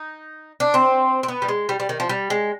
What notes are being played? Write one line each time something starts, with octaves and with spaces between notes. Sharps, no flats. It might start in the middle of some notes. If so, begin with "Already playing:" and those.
Already playing: D#4
D4
C4
C4
B3
G3
G#3
G3
G3
D#3
F3
G3
G#3